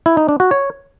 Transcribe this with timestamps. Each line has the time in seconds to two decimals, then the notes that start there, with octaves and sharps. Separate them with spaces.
0.06 E4
0.17 D#4
0.29 D4
0.40 F#4
0.51 C#5